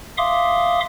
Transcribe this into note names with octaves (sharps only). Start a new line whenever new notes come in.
E5 F5 C6 D6 D#6